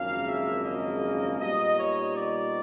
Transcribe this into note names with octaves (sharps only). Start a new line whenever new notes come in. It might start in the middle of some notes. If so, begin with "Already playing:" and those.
Already playing: G#1 F#2 C#3 F3 A#3 F5
E5
D#5
A#2 G3 B3 D#4 D#5
C#5
D5